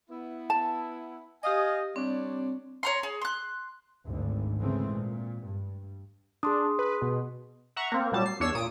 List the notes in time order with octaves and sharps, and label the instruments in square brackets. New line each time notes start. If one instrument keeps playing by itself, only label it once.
[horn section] B3 E4
[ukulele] A5
[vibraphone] G4 D#6 [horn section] D#5 F5 G#5
[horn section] G3 D4 C#5 [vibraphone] C4
[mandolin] C#5 A#5 C6
G#4
C6 F#6
[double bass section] G#1 D2 D3
C#3 E3 G#3 A3 C4
A#2
G2
[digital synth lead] D4 [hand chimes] G#4 C6 D#6
[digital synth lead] B4
B2
[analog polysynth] E5 F#5 A#5 C#6
A#3 C4
A#2 F#3 G3 A5
C7
E2 D4 C#5 E6 C7 E7
A#2 D#6 D7